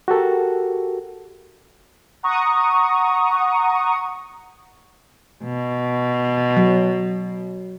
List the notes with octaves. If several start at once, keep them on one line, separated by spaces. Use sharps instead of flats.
F#4 G4 A4 A#4
F#5 A#5 C#6 D#6
B2
F#3